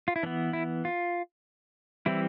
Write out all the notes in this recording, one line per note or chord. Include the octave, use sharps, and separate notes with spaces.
F4
E4
E3 B3 D4
E4
F4
E3 G3 C4 E4